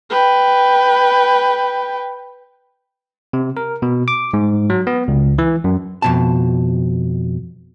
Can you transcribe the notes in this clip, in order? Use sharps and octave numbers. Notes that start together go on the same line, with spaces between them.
B4 G5
C3
A#4
B2
D6
G#2
F#3
B3
C#2
E3
F#2
F2 B2 A5